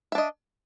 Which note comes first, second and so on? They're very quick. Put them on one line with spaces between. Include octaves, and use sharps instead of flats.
E5 D4 D#5